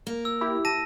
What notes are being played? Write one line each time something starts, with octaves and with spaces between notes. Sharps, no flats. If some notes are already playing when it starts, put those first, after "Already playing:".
A#3
E6
E4 G4
A5 A#6 D#7